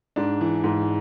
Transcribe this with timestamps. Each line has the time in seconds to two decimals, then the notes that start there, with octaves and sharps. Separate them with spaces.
0.16 G#2 D4
0.41 E3
0.64 G#2